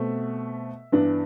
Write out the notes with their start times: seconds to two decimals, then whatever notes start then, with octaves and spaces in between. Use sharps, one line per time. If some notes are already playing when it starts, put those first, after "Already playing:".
Already playing: B2 A3 C4 E5
0.92 G2 E3 B3 D4